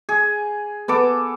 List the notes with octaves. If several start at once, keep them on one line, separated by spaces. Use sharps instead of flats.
G#4
B3 A4 D6